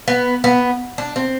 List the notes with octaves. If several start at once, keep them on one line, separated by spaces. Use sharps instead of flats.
B3
B3
D4
C4